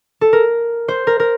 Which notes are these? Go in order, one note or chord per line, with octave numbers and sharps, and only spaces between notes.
A4
A#4
C5
A#4
A#4